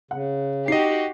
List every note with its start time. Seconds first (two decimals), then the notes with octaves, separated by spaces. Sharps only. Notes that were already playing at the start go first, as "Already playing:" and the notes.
0.11 C#3 F#5
0.68 D#4 F#4 G4 D#5 C7